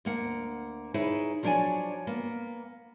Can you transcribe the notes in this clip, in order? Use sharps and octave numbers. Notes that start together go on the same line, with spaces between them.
D2 A#3 F#5
D#4 E4 G#4 B4 C#5
F3 F#3 D4 C#5 D5 G#5
A#3 B3